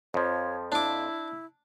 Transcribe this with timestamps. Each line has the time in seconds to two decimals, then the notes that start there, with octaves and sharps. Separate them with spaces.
0.14 F2 F3 C#5
0.72 D4 E4 D6